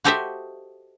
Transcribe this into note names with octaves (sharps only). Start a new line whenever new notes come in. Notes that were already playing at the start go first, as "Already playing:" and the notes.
F#4 G4 A4 C5 D#5 E5